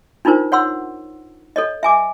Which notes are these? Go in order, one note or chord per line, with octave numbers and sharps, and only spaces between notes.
D4 D#4 F4 A#4 C5
C#5 F#5 C6 E6
A4 C#5 D#5
E5 G#5 D6